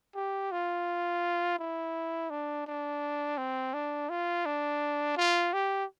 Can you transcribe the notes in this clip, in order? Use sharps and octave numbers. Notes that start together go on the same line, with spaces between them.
G4
F4
E4
D4
D4
C4
D4
F4
D4
F4
G4